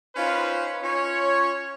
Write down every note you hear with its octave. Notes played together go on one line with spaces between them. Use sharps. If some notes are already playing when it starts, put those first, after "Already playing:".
C#4 D#4 F4 B4 C5
C#4 F4 C#5